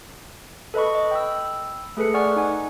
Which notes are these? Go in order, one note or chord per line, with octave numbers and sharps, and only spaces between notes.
A4 B4 D#5 B5 C#6
D#5
G5 B5 E6
A3 G#4 A4 B4 C#7
D5 F#5 G#5 C#6 F6
D#4 F#5 G#5